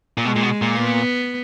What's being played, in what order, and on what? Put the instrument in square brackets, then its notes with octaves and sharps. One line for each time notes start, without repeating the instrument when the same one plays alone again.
[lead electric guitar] A#2
[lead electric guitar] B2 [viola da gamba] G#3
[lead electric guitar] A#2
B2
A#2
[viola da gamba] B3